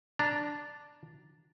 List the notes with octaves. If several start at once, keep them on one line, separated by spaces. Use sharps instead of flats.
D4 A#5 A6